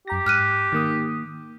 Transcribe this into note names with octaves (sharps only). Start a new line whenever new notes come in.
F#2 G4 A#5 A#6
G#2 F6 F#6 D#7
D#3 A#3 D#6